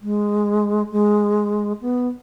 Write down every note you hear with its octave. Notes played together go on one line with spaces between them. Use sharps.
G#3
G#3
B3